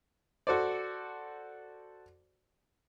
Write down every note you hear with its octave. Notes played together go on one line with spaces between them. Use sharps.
F#4 A4 C5 D5